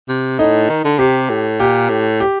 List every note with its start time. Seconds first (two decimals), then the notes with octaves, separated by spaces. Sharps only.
0.08 C3
0.39 A2 D#4
0.69 D#3
0.84 D3
0.99 C3 G4
1.29 A2
1.60 A#2 G4
1.89 A2
2.20 G4